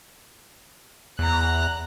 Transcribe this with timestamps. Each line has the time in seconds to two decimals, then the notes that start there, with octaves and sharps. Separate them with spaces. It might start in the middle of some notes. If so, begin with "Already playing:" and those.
1.19 E2 A#5 F#6